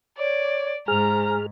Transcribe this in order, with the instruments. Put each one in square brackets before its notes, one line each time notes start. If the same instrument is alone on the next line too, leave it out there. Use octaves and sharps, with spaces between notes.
[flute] C#5 [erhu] D5
[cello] G#2 [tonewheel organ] G#4 F6 [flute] C5 [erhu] A#5